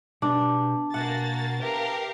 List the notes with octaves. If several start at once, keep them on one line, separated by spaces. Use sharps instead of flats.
B2 D4 G4 B4
B2 A#3 F#4 F#5 G#5 A6
G4 A#4 B4 E5 F5 A5